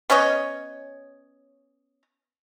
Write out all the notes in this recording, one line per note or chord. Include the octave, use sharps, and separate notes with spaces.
B3 C#4 C#5 D#5